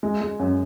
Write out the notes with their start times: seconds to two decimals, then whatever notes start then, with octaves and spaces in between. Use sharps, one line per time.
0.03 G#3
0.21 G#3
0.39 F#2